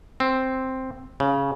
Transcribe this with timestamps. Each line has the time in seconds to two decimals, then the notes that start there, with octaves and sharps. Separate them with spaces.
0.20 C4
1.20 C#3